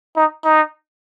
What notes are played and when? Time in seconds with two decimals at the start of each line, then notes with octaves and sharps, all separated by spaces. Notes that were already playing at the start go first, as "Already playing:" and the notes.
0.17 D#4
0.45 D#4